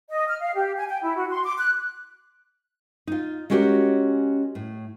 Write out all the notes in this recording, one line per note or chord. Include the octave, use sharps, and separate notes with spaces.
D#5
F6
F5
G4
G#5
G5
E4
F#4
C6
D6
F#6
D#4 F4
G#3 C#4 F#4 G4 A#4 C#5
A2